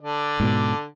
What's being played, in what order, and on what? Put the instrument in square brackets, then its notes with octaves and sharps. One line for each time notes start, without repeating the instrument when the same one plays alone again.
[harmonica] D3 D5
[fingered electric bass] G#2 B2